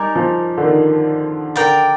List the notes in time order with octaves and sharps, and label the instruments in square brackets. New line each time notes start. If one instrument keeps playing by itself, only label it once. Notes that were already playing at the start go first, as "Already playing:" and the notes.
Already playing: [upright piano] G3 [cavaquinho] D#4 A#4 D5 G#5
[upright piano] F3
D3
D#3
[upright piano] D3 [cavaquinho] A#4 D5 G5